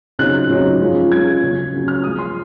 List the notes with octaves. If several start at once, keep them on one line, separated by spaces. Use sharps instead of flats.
C#3 F#3 C4 D#4 F#6
C#3 F#3 C4 D#4
F3 G#3 C#4 F4
F3 G#3 C#4 F4 G#6
C#3 F#3 C#4
C#3 F#3 C#4
F6
C3 F3 G#3 D#6
C6